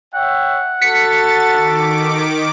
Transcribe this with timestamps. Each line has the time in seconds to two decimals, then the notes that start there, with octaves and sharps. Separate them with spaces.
0.15 C#5 E5 F#5 G5
0.82 F#4 A4 A6 B6 C#7
1.49 D#3 D6